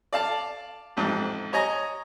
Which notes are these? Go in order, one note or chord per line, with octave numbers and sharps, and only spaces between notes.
D5 F5 A5
A1 F2 G#2
C#5 D#5 G#5 A#5